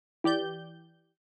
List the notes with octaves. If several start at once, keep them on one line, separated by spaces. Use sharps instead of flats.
E3 G4 D5 G6